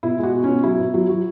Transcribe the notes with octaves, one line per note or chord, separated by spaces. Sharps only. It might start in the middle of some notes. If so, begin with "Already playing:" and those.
B2 E4
G#3 F#4
B2
C#4
B2
F#3 E4
B2
F#3
F#3